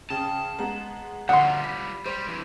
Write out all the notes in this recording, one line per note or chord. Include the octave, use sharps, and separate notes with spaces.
C#3 G5 A5 D#6
G#3 B3 A#5
A#1 D3 G3 F4 F#5 C6
B5 B6
G3 G4 C5
G2 E3